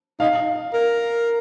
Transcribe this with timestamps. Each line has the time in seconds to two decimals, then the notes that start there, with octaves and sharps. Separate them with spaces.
0.20 D#4 F5
0.74 A#4